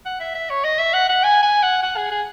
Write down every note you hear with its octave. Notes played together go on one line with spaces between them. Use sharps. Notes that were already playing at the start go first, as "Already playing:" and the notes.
F#5
E5
E5
C#5
D#5
E5
F#5
F#5
G#5
G#5
F#5
F#5
G#4
G#4